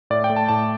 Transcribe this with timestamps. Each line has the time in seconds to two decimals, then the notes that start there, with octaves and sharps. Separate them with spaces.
0.10 A2 D5
0.24 G5
0.30 A3
0.36 A5
0.48 A2 A5